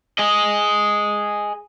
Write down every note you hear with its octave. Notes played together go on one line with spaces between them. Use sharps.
G#4 D#5